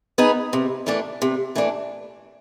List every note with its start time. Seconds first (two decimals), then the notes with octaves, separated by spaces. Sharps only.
0.18 B3 D#4 G#4 B4
0.53 C3
0.86 E3 A3 D4
1.22 C3
1.56 E3 A3 D4